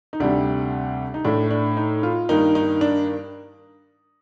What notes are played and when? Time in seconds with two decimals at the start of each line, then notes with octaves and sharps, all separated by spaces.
0.13 D#4
0.20 D2 C3 G3 D4
1.14 D#4
1.25 A2 A3 D4
1.51 D4
1.77 D#4
2.03 F4
2.29 G2 D#3 A#3 D#4
2.55 D#4
2.81 D4